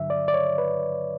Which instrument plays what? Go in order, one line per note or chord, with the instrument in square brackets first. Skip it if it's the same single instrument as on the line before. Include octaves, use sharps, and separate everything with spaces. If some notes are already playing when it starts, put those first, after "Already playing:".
Already playing: [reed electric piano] G2 D3 F#3 E5
D5
D5
C#5
B4